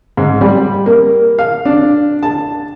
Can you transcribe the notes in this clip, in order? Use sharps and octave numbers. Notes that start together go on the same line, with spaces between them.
G#2
G3
A#3
F5
D4
A5